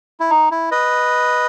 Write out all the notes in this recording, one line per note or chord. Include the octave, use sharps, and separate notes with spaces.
E4
D#4
E4
B4 D#5